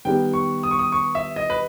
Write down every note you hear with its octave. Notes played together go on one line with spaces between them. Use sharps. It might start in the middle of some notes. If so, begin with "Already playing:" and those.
D#3 G3 B3 G4 G5
C#6
D#6
C#6
D#6
C#6
E5
D#5
B4